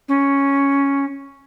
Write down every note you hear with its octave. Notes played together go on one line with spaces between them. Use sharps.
C#4